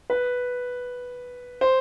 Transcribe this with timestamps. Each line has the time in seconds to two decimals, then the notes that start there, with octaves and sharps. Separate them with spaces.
0.10 B4
1.61 C5